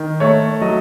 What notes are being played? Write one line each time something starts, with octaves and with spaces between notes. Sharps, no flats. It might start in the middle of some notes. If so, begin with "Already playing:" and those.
Already playing: D#3
A3 C#5
F#3 D#5